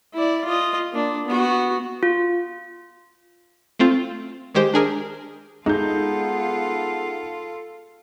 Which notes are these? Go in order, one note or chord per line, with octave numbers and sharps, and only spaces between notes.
E4 D5
F4 D#5
A#3 D4
B3 F#4
F4
A3 C4 F4
D#3 G#3 G4 C5
D4 G#4 A#4
G#3 B3 D#4 F4 A4 G6